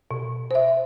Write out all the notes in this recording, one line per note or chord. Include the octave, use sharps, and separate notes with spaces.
B2
C5 E5